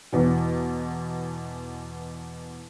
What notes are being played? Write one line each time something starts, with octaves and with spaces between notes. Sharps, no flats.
E2 B2 E3